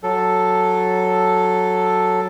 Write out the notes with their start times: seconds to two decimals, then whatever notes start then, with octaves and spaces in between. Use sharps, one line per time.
0.03 F#3 A4